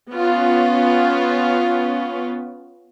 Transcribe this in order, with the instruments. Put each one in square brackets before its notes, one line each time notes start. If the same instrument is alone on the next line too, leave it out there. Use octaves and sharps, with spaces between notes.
[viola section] B3 C#4 F4